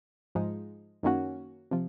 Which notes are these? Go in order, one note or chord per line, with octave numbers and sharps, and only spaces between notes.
G#2 F3 G#3 D#4
F#2 D#3 A#3 C#4 F#4
C3 F3